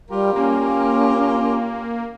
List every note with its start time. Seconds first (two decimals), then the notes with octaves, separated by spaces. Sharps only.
0.10 G3 F4 G4 A#4
0.36 A#3 C#4